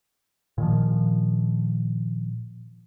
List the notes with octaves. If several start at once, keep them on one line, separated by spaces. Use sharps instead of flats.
A#2 D#3 F3